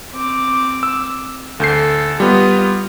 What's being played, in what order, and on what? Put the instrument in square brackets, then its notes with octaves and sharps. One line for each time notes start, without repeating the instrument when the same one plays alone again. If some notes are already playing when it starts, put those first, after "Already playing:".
[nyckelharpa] C4 D6
[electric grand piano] E6
[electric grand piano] D2 G6 C7 [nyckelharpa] A4
[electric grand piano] G3 B3 [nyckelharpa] F4 D#5